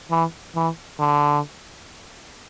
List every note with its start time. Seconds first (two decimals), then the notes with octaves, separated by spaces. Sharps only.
0.11 E3
0.55 E3
0.99 D3